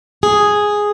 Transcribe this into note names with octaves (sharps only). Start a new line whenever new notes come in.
G#4